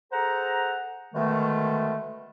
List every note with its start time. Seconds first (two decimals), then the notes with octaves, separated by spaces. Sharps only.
0.12 G#4 A4 C5 F#5 A#5
1.15 B2 D3 D#3 G#3 A3